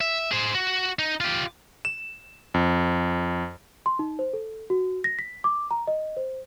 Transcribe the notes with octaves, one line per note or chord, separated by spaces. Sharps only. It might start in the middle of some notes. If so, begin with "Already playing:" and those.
E5
G#4 C5
F#4
D#4
F4 G4
E7
F2
C6
D#4
C5
A4
F#4
A#6
B6
D6
A#5
D#5
C5